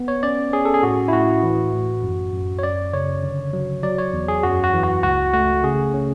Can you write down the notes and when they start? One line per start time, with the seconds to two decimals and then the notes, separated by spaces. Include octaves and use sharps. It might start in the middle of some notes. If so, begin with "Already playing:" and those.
Already playing: B3
0.08 C#5
0.23 C#4 D5
0.53 C#4 G#4
0.65 A4
0.74 G#4
0.83 A2 F#4
1.08 E4
1.13 A2 F#4
1.43 E3
1.73 A2
2.03 F#2
2.33 F#2
2.59 C#5
2.63 F#2 D5
2.93 C#3 C#5
3.23 D3
3.53 F#3
3.83 F#3 D5
3.98 C#5
4.13 E2
4.28 G#4
4.43 F#2 F#4
4.64 F#4
4.73 E3
4.83 F#4
5.03 C#2 F#4
5.34 A3 F#4
5.64 C#3 G#4
5.94 C#4